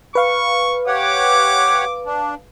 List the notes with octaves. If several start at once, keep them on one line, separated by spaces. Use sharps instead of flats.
B4 F5 C#6
G4 C#5 F#5 D6
D4